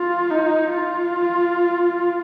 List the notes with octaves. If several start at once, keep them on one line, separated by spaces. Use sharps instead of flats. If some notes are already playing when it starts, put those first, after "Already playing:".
Already playing: F4
D#4
F4